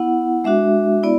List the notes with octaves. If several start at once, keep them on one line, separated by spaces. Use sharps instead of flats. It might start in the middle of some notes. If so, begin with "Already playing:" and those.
Already playing: B3 E4 F#5
G#3 D4 F#4 E5
B3 E4 D5